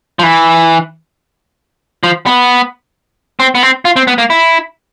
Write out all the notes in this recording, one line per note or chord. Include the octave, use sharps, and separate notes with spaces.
F3
E3
F3
B3
C4
B3
C4
F4
C4
B3
A#3
E4